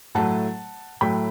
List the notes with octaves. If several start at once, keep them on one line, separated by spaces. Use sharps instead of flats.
A2 F#3 A3 F#5 A5
A2 F#3 A3 G5 B5